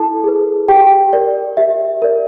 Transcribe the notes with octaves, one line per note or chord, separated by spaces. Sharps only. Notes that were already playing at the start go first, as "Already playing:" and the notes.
Already playing: E4 A4 A5
G#4 B4
G4 G5
A#4 D5
G4 E5
A#4 D5